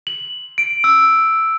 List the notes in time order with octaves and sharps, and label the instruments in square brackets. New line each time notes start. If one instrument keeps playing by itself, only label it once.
[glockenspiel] F#7
D7
E6